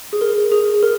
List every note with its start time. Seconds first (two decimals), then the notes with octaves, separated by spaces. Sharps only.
0.13 G#4
0.21 A#4
0.52 G#4
0.83 A#4